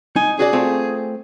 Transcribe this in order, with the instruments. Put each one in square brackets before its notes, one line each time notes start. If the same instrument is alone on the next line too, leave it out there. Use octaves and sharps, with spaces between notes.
[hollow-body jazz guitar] D#4 [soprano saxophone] G#5
[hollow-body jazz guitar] C#4 F#4 D5 [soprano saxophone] G#4
[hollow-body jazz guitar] A3 C4 F4